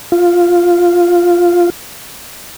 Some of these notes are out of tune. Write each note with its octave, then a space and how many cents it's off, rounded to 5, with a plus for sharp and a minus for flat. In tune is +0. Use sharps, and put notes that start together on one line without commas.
F4 +0